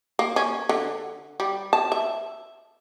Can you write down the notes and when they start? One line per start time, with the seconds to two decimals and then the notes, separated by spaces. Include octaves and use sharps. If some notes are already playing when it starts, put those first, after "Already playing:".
0.19 A#3
0.36 C#4
0.69 D3
1.40 G3
1.73 A5
1.92 E5